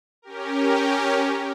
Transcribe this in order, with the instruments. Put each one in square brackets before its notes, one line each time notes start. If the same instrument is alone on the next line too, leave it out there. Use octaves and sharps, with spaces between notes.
[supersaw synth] C#4 G4 A#4